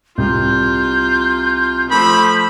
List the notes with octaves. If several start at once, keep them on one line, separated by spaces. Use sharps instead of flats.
C2 F4 G6
F3 A3 B5